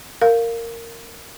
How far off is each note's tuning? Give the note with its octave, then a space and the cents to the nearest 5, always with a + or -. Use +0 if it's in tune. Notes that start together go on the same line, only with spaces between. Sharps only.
A#4 -15 F5 +0